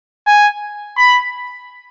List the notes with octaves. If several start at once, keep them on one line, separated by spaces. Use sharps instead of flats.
G#5
B5